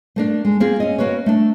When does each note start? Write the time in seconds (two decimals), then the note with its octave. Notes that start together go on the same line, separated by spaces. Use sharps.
0.16 A3 A#3 D4
0.45 G#3
0.60 A#3 C4 F4 G#4
0.80 C#4 D#5
0.98 A#3 F#4 B4 C#5
1.26 A3 D4